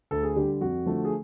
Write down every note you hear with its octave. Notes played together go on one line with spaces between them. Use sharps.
D2 A4
G#4
D3 G3 G4
F2 F#4
D3 F3 A3
G#4